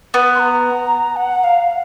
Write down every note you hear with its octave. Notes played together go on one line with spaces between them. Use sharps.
B3
C6
A#5
F#5
F5